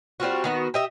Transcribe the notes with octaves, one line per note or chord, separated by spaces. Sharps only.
G3 C4 F4 F#4
D#3 B3 F#4
G4 D#5 E5